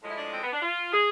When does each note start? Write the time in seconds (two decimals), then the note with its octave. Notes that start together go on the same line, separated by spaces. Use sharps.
0.02 A2 F3 G#3
0.10 E4
0.17 D4
0.32 C4
0.42 B3
0.53 D4
0.62 F4
0.93 G#4